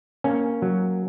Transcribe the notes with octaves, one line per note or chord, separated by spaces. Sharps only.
A#3 C#4
F#3